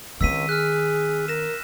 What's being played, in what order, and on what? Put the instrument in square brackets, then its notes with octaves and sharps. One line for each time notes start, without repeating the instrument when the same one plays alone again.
[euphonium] C#2 [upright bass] D#3 C4 [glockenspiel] E6 B6 D#7
[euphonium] G#4 [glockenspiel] F6 F#6
[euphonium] A#4 [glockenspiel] A#6 E7